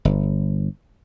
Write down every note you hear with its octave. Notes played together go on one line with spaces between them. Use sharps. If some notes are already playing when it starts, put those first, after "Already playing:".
G1